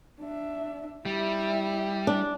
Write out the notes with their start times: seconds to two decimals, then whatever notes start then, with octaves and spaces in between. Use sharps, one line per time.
0.20 D4 E5
1.06 G3 E4 E5
2.07 D4